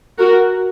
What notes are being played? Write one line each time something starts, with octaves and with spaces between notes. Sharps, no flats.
F#4 A#4